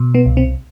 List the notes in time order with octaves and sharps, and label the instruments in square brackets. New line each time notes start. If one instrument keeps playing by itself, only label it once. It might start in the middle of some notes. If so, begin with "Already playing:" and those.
Already playing: [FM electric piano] B2
B3
C2
C4